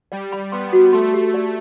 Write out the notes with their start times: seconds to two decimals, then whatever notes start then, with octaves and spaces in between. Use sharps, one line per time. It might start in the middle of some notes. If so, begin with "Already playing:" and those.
0.12 G3 D5
0.32 B5
0.52 B3 C6
0.73 F#4
0.93 A3 C6
1.14 G4
1.34 D5